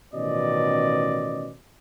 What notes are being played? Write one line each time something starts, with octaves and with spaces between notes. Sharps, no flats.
A1 B2 D#3 C#4 D5 D#5